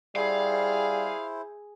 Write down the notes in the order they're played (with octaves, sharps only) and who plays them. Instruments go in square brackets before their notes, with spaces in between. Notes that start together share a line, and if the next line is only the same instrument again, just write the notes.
[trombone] G3 [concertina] E4 C5 [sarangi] G#4 [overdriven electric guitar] F5